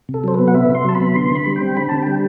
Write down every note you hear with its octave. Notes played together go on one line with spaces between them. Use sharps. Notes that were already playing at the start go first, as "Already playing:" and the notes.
C3
A4
F#3 C5
B3 B4
F#5
C3 E5
C3
C6
F#3 A5
B5
B3
D3 C6
D3 B5
G3
G5
C4
D3 B5
D3 A5
G3 G5